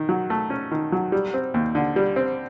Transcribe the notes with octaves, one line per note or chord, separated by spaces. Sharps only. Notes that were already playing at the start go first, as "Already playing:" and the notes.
Already playing: D#3
F#3
A3
C#4
D#3
F#3
G3
C4
D#2
D3
G3
C4